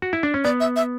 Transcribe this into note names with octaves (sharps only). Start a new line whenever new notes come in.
F#4
E4
D4
C#4
B3 D5
E5
E5